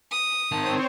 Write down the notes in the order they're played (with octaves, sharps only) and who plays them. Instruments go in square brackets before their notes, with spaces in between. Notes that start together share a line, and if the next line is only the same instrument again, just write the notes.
[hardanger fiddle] D#6
[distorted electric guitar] D#3 A5 [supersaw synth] C4 C5 C#5